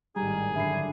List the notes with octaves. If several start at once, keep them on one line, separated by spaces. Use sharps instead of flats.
G#1 A2 D#3 G3 G#4 A#5
F#2 D3 E5 B5 C7